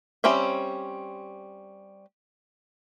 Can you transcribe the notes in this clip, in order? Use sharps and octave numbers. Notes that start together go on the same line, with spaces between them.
G3 C4 C#4 C5 E5